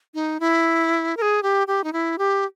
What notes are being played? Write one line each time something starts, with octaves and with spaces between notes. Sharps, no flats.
D#4
E4
A#4
G#4
G4
G4
D#4
E4
G4